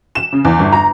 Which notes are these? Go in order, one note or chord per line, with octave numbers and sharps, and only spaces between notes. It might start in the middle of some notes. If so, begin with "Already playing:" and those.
E7
C#3
E2
G1
A#5